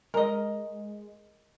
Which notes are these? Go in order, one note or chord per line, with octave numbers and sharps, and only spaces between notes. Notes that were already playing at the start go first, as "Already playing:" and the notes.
G#3 A#4 D#5